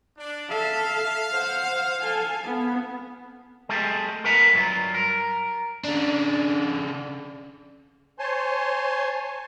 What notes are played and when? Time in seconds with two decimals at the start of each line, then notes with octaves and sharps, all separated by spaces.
0.17 D4
0.49 A4 E5 F5
1.32 C5 F#5
2.01 A4 G#5
2.44 B3
3.69 G#3 A3 G4 A4
4.25 A#4 B4 E5 F#5 A#5
4.53 G2 F#3 F4
4.94 A#4
5.84 C#3 D4
8.19 C5 C#5 G#5 A5 C6